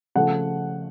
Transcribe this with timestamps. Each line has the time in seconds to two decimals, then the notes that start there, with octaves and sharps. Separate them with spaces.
0.15 C#3 F3 A3 F#5